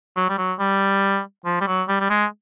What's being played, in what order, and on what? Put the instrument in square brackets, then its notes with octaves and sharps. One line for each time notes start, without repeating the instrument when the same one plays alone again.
[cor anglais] F#3
G3
F#3
G3
F3
G3
F#3
G3
G3
G#3